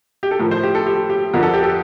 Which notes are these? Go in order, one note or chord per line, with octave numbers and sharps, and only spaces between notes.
G4
A4
A2 F3 A#4
C5
G4
A4
G4
G4
F2 D3 F3 A#4
A4
G4
A4